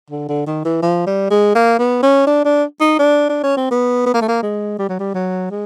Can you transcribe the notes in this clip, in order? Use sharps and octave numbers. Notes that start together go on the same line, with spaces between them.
D3
D3
D#3
E3
F3
G3
G#3
A#3
B3
C#4
D4
D4
D#4
D4
D4
C#4
C4
B3
B3
A#3
A3
A#3
G#3
G3
F#3
G3
F#3
G#3